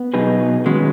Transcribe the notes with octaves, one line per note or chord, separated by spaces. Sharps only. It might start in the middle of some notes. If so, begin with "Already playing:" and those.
Already playing: B3
B2 F#3 D#4 G#4 B4
D#3 F#3 G#3 C#4 F#4 B4